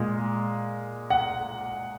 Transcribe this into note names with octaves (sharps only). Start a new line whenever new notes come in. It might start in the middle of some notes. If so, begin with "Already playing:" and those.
Already playing: A#2 G#3
F#5